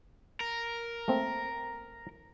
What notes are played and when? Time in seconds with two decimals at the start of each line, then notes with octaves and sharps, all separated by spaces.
0.40 A#4
1.08 A3 A#3 C4